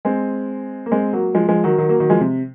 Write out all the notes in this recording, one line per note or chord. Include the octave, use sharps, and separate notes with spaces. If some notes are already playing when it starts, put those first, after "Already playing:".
G#3 C4
A#3
G#3 C4
F#3 A#3
F3 G#3
F3 G#3
D#3 F#3
D#3 F#3
F#3 A#3
D#3 F#3
F3 G#3
C3